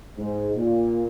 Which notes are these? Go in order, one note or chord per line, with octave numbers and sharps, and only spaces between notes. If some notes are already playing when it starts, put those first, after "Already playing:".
G#2
A#2